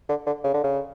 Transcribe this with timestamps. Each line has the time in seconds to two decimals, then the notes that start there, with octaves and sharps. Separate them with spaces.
0.09 D3
0.26 D3
0.44 C#3
0.54 D3
0.64 C#3